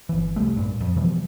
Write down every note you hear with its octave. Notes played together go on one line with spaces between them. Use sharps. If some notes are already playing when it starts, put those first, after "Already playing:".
G1 E3
C2 G3 A3
G2 A#2
F2
B2 E3 F3 G3